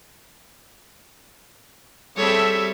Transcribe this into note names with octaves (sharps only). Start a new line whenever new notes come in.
G3 C4 G#4 A4 C#5 E5